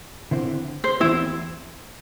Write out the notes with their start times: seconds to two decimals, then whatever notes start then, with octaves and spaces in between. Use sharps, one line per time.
0.31 D3 C4 E4 C5
0.84 C5
1.00 E2 E3 C4 E4 G4 C5